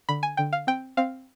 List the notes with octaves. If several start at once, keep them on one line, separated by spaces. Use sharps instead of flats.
D3 B5
G#5
D3 G5
F5
C4 G5
C4 F5